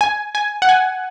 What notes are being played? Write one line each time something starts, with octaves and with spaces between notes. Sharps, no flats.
G#5
G#5
F#5
G#5